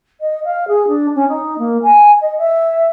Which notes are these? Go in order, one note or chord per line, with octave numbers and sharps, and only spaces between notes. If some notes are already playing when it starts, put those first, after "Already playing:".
D#5
F5
G#4
D4
C#4
D#4
A#3
G#5
D#5
E5